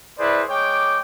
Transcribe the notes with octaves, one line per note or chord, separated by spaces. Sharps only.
E4 G#4 B4 C5 D5
G#3 C#5 G5 D6